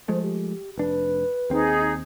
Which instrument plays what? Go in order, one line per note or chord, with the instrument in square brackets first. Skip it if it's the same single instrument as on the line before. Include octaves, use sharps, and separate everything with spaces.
[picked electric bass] F3 G#3 A3 [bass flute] C5
[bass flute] G4
[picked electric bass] F1 D4 [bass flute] B4
[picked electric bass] D#2 C4 [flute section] D#4 G#4